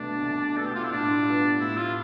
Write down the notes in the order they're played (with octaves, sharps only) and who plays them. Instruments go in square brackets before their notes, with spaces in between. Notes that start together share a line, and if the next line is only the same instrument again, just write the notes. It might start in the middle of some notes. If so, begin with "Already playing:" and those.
Already playing: [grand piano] C2 B2 A3 [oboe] D4
[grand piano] C2
[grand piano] B2 [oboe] A4
[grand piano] A3 [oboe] G4
[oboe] F4
E4
[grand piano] A2 [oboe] D4
[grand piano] G3 B3 F4
[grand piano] A2 [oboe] E4
[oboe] F4